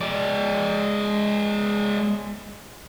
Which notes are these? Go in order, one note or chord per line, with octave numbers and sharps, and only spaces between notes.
G#3 D5